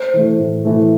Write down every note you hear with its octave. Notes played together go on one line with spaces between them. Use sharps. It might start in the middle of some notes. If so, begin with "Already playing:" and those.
Already playing: C5
E3 A3
A2
E3 A3